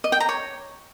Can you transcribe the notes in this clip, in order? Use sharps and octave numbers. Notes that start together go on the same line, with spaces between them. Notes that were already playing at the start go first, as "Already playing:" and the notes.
D#5
G5
A#5
C#5